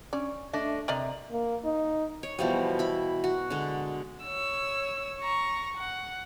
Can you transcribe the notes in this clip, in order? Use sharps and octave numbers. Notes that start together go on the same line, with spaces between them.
C#4 D5
A3 D4 D#5
C3 A#4 D5 D#5 A#5
A#3
D#4
C#5
B2 E3 F3 G3
E4 B5
F#4
D3 G#3
C#5 E6
A#5 C#6
F#5